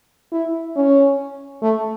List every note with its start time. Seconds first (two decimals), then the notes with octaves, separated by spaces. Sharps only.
0.32 E4
0.76 C#4
1.62 A3